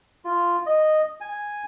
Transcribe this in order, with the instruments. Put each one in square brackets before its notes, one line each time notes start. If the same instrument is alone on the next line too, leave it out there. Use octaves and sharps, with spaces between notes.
[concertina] F4
D#5
G#5